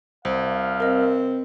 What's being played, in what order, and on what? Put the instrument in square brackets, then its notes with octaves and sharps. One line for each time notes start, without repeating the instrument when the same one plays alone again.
[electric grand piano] C2 [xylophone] C5 [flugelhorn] F5
[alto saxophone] C4 [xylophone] A#4 D#5